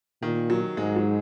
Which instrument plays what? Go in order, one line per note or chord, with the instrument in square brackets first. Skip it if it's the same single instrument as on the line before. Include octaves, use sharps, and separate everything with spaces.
[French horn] A#2 [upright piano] D#3
[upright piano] F#3
[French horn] G#2 [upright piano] G#3
[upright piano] F#3